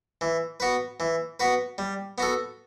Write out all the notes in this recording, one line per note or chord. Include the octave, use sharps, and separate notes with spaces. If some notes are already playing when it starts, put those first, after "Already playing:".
E3
B3 F#4 B4
E3
B3 F#4 B4
G3
B3 F#4 A4